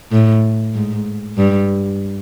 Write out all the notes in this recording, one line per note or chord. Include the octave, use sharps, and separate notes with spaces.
A2
G#2
G2